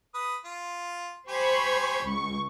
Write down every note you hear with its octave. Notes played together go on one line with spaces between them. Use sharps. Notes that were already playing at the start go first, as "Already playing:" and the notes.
B4 D#6
F4
G4 C5 G#5 B5 C#6
C#2 C#6